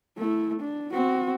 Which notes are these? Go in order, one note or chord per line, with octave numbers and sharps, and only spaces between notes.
A3 E4
D4
C4 F#4